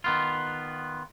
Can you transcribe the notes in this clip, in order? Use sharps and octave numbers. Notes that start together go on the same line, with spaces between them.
D#3 B3 F4